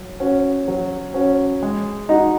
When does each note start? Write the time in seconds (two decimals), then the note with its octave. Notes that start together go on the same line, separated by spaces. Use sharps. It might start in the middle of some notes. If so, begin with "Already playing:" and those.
Already playing: F#3
0.20 C#4 F#4
0.68 F#3
1.14 C#4 F#4
1.62 G#3
2.09 D#4 F#4